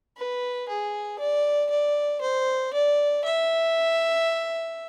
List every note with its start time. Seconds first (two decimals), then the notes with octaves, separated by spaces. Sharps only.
0.17 B4
0.68 G#4
1.19 D5
1.70 D5
2.21 C5
2.73 D5
3.25 E5